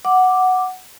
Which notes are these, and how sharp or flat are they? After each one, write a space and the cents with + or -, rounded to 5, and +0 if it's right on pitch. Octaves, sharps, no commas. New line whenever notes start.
F#5 +0 D6 +0